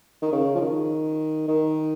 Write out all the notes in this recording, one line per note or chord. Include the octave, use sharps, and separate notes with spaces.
D#3
C#3
F3
D#3
D#3